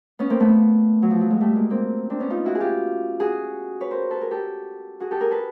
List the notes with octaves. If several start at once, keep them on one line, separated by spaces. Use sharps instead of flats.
B3 C#4
A#3 C4
A3 B3
F#3
F3
F#3
F#3 G#3
G3 A3
G#3 A#3
A#3 C4
C4 D4
B3 C#4
D#4 F4
E4 F#4
G#4
F4 G4
F#4 G#4
B4 C#5
A#4 C5
A4 B4
G#4 A#4
G4 A4
F#4 G#4
G4 A4
G#4 A#4
A4 B4